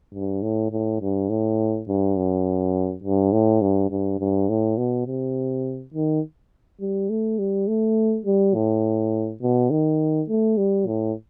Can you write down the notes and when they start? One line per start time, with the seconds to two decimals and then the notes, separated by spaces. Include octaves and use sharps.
0.14 G2
0.43 A2
0.72 A2
1.01 G2
1.30 A2
1.88 G2
2.17 F#2
3.04 G2
3.33 A2
3.62 G2
3.91 G2
4.20 G2
4.49 A2
4.78 B2
5.07 C3
5.94 D#3
6.81 G3
7.10 A3
7.39 G3
7.68 A3
8.26 G3
8.55 A2
9.42 B2
9.71 D#3
10.29 A3
10.58 G3
10.87 A2